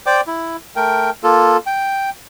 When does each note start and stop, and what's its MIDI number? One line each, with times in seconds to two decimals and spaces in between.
0.06 0.21 72
0.06 0.21 74
0.06 0.21 79
0.06 0.21 86
0.27 0.57 64
0.76 1.10 57
0.76 1.10 70
0.76 1.10 79
1.23 1.57 58
1.23 1.57 65
1.23 1.57 69
1.66 2.10 79